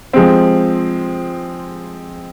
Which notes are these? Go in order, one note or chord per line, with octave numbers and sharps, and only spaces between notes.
F3 G#3 C4